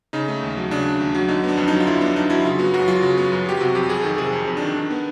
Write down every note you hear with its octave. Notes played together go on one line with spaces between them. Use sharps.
C#3 D#4
A3
D#2
F#3
C#3 D4
A3
D#2
F#3
D3 D#4
B3 D4
F2
D#4
F#3
F4
D3 E4
B3 D4
F2 D#4
F#3 E4
C#3 F4
B3 F#4
F#2 F#4
F#3 F4
C#3 F#4
B3
F#2
F#3 G4
C3 F#4
F2 G4
F2 G#4
D#3 A4
C3 G#4
F2
F2
D#3 D4
D#3
B3